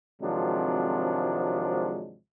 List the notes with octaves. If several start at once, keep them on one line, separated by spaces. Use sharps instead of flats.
G#1 C3 F3 F#3 G#3 D4